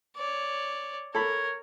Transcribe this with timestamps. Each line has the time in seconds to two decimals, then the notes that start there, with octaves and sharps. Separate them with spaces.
0.16 C#5 D5
1.15 A4 A#4 C#5 B5